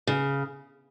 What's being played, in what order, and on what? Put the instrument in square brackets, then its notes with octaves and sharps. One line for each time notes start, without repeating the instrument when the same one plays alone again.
[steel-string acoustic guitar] C#3